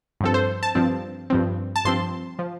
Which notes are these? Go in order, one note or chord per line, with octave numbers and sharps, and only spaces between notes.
G2 F3 C4 A4
C5
A5
G2 F3 C4
G2 F3 C4
A5
G2 F3 C4 C6
F3